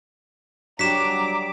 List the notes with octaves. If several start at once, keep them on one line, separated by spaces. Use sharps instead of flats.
F#3 G3 D4 G4 A#5 D6 B6 E7